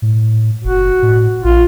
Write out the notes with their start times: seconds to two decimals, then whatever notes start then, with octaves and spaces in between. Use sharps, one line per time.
0.02 A2
0.64 F#1 F#4
1.02 A2
1.44 A#1 F4